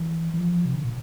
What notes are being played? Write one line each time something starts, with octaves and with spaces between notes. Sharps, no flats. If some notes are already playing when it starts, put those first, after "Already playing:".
Already playing: E3
E3
F3
C3
D3
A#2